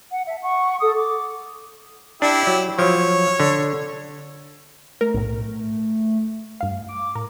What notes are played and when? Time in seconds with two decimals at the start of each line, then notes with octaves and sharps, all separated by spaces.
0.11 F#5
0.28 E5 A5
0.41 F#5 C#6
0.81 A4 D#6
0.95 D6
2.22 D4 E4 G4
2.47 F#3
2.79 F3 F#3 C#5
3.40 D3
5.01 A3 A#4
5.14 B1 A2
6.61 G2 F5
6.89 D6
7.15 A2 A#4